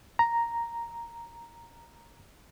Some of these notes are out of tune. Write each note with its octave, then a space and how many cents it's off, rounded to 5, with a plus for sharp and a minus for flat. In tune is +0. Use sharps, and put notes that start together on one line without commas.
A#5 +0